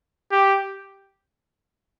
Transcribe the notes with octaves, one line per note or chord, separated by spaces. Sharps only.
G4